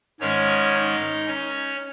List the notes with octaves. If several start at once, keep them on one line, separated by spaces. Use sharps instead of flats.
G#2 D#3 G#3 C#4 C#5
D#4 D#5
C#4 C#5